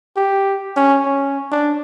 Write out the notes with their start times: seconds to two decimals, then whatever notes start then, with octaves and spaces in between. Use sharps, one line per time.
0.17 G4
0.77 C#4
1.06 C#4
1.52 D4